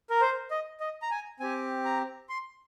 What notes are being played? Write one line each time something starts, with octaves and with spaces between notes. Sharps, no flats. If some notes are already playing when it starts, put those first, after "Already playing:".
A#4
C5
D#5
D#5
A#5
G#5
C4 G4 G#5
A#5
C6